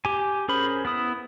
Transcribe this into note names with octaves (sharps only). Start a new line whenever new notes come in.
G4 G#5
C#4 G#4 A#4 C5 B5
B3 E4 D#6